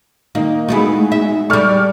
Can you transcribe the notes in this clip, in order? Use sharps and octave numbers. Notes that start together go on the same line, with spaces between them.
D#3 A#3 D#4
G#3 A3 B3 D#4 E4 F#4 G#4
E5
G3 G#3 A4 D5 C#6 D6 F6